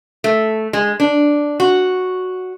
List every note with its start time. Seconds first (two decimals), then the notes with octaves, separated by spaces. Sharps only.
0.24 A3
0.73 G#3
1.00 D4
1.60 F#4